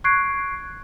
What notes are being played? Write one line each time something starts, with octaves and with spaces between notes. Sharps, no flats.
C#6 F#6 G#6 C7 D7